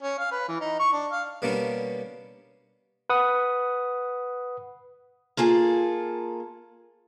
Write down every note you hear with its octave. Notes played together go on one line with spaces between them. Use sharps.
C#4
F5
B4
E3
D#4
C#6
D4
F5
B2 G3 A#3 B3 C#4 D4
B4 F#5 D#6
A#3 F4 G#4 A4